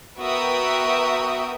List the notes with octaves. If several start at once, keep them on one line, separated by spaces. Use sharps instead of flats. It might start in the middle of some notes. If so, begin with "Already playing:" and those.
B3 F#4 A#4 E5 G5 D#6